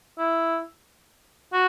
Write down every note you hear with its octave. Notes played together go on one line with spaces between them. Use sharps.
E4
F#4